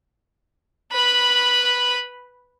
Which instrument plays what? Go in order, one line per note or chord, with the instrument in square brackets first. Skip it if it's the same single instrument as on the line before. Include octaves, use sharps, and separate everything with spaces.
[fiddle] B4 B5